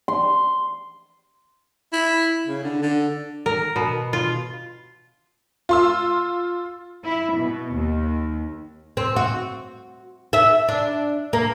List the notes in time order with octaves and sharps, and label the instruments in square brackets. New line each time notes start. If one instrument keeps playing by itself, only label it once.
[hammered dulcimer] C6
[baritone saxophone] E4
C#3
D3
D3
[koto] A#4
B2
F4
[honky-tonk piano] F4 C6 E6
[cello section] E4
B2
D#2
[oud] C4
F#4
E5
D4
A#3